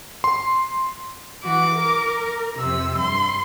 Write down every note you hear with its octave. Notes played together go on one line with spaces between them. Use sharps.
C6
E3 F#4 D6
A#4
F2 C3 E6
G2 C6